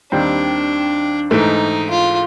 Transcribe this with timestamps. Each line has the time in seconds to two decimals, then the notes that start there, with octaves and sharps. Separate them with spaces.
0.12 D#2 D#3 G3 C4 D4
1.31 G#2 E3 A3 D#4
1.90 F4